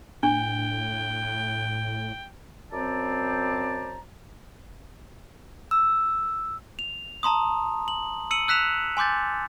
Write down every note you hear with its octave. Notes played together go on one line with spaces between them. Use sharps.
A2 D4 G5
F#2 C4 C5 D5 A5 A#5
E6
F7
A5 A#5 C6 D#6
F#7
E6 C#7 D#7 F#7
E6 F#6 B6 E7 F7
G#5 C6 D6 G6 A6